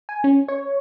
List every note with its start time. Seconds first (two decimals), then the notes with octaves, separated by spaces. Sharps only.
0.09 G#5
0.24 C#4
0.48 C#5